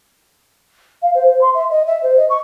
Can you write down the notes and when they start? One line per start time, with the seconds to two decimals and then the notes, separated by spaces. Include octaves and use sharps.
1.02 F5
1.14 C5
1.27 C5
1.41 C6
1.54 E5
1.70 D#5
1.87 E5
2.03 C5
2.16 D#5
2.30 C#6